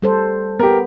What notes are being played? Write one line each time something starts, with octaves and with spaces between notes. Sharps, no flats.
G3 A4 C5
B3 G4 A#4